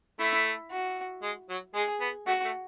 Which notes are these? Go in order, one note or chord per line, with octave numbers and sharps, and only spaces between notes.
A3 E4
F#4
G#3
F#3
G#3 G#4
B3
A3 F#4
A3